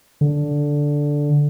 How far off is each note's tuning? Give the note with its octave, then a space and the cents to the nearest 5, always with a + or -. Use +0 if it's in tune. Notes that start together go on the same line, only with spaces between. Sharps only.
D3 -5